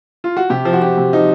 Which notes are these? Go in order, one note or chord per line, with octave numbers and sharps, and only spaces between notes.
F4
F#4
C3 G4
F3
F#4
F3 G4
C3
F3 D#4